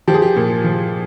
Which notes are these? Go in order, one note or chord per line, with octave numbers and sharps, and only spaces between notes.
F3 G4
G#4
G4
A#2
F3